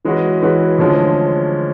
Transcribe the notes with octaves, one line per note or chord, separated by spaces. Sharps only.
E3 G#3 C#4 F#4 B4
E3 G#3 C#4 F#4 B4
D2 D3 F3 G#3 C#4